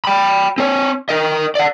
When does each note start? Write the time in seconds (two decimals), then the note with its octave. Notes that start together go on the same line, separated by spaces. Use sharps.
0.05 G5 B5
0.58 C4 C#5
1.09 A#4 D#5
1.55 D5 F#5